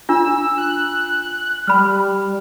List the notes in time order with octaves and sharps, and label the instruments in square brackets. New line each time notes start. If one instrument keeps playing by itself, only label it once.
[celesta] D4 F4 [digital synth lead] E6
[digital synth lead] F#6
[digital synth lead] G3 [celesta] B5 F6